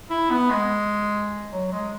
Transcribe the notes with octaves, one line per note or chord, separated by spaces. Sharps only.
E4
B3
G#3
F#3
G#3